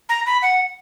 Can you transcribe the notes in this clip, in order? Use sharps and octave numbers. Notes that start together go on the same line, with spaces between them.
A#5
B5
F#5